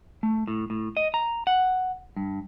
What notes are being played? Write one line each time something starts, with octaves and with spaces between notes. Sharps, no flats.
A3
A2
A2
D#5
A#5
F#5
G2